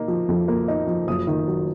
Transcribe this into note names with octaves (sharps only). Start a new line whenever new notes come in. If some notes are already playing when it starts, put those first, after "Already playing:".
Already playing: A#3 D#4
F3
F2
A#3
D#4
F3
F#1 D#6
D#3
F#3